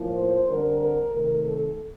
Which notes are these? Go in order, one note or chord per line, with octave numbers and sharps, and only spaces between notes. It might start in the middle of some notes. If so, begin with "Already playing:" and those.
Already playing: A2 F3 A#3
C5
D3 G3 C4 A#4
A#4
C3 D#3 A3 A#4
A4